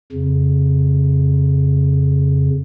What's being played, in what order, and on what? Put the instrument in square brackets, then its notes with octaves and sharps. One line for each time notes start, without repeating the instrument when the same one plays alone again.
[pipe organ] F2 C#3